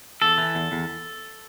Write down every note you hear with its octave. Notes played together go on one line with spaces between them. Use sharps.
E2 A4
E3
E2
E2